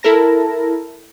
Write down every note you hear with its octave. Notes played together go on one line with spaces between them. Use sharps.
E4 A4 A#4 A5 A#6